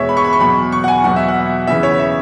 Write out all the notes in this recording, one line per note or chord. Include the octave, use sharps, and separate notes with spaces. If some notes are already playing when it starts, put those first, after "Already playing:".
Already playing: E2 B2 G#3 C#5 E5
B5
C#6
B5
C#6
E2 B2 F#3 B5
C#6
F#5
G#5
E2 B2 F#3 F#5
E5
F#5
E2 C#3 E3 E5
C#5
E5